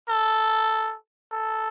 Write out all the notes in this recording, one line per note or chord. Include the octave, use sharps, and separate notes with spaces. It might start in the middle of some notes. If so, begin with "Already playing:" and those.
A4
A4